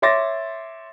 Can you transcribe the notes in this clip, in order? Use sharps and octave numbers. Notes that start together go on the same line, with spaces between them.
C#5 E5 C6 D6 A6 A#6